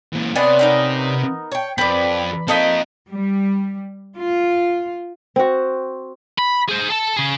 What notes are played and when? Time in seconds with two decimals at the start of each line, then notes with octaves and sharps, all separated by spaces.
0.13 A#2 E3
0.36 C3 B3 C#4 D5 F#5 C6
0.59 B3 D#4 A#4
1.52 C#5 G5
1.78 F2 C4 B4 D5
2.48 A#3 C4 D#4 F4 A4 D#5 B5
3.10 G3
4.17 F4
5.36 C4 F#4
6.39 B5
6.69 G#4 C5
6.90 A4 A5
7.17 C#3 G#4